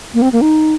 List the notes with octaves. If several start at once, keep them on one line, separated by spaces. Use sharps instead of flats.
A#3
C4
A#3
D#4